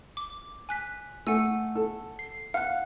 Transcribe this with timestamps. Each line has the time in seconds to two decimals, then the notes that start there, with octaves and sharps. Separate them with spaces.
0.17 D6
0.69 G#5 F#6 B6
1.27 A3 F#5 G#5 E6
1.75 A4
2.19 C7
2.54 F5 F#5 F#6